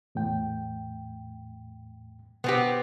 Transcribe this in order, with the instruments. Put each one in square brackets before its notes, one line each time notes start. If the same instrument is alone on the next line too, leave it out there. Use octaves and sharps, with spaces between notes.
[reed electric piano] E2 A2 G5
[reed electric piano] B2 [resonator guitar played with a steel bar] B3 C4 G4